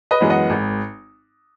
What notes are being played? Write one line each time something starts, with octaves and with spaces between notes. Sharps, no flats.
B4 D#5
F#2 E3 G#3 B3
D#5 F#5
G#1